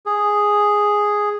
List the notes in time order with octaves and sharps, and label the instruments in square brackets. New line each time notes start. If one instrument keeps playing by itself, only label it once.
[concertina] G#4